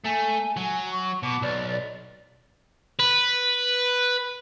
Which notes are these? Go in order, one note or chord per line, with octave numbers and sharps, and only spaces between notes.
A3 G#5
F#3 G#5
C#6
B2 D6
B1 D5
B4